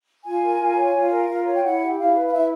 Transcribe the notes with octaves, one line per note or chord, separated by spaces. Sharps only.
F4 G#5
A#4
F4
C#5
F4
A#4
F4
C#5
G5
E4 F#5
G4
E4 F5
B4
F5
E4 E5